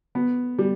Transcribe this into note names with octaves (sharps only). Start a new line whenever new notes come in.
B3
G3